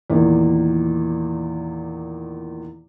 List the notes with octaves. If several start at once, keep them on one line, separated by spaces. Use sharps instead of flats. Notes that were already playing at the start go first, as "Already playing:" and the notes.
E2 A#2 D#3